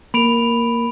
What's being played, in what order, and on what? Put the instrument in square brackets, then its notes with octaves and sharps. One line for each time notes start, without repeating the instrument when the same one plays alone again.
[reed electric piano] A#3 A#4 [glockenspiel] B5 D7 F7